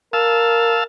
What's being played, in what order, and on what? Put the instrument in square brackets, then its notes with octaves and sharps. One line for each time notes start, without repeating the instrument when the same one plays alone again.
[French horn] A#4 [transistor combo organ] F5 A5 E6